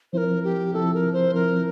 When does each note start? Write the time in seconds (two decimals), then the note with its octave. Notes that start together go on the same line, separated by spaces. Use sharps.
0.13 F3 C4 E4 A#4 C5
0.44 G4
0.74 F3 C4 E4 A4
0.94 A#4
1.13 C5
1.34 F3 C4 E4 A#4